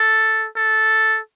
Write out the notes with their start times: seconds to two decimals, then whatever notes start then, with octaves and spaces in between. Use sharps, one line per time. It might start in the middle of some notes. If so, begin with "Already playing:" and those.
Already playing: A4
0.57 A4